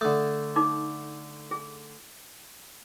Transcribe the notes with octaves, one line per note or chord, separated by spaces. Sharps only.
D3 A3 D#6
D#4 A4 D6
G#4